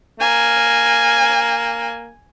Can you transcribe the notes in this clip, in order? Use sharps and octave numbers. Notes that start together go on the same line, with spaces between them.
A#3 G#5